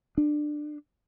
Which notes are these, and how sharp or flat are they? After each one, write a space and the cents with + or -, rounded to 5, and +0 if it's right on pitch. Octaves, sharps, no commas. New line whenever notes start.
D4 +20